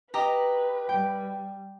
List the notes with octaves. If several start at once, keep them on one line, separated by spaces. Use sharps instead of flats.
G4 B4 D#5 A#5
G3 G5